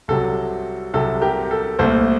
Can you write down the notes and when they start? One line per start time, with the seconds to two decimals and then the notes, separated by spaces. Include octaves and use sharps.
0.08 C2 C3 F#3 A4
0.93 C2 C3 F#3 A4
1.21 G4 A#4
1.51 A4
1.79 C2 A#2 A3 A4 C5